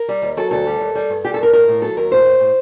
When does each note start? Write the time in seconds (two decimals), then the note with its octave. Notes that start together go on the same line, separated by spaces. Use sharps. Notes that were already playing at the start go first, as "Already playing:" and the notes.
Already playing: A#4
0.09 G3
0.22 D#2
0.37 F#3 A4
0.51 D2 A4
0.67 G3
0.80 D#2
0.95 G3
1.10 G2
1.24 G3 G4
1.34 A4
1.38 G2 A#4
1.53 A2 A#4
1.68 A2
1.82 F#3 A4
1.97 D#2 A#4
2.11 A2 C5
2.25 A2
2.40 A2